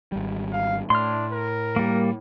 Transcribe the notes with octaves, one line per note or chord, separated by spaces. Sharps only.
G#1 G3
F5
A2 D4 C6 F6
A#4
G3 A#3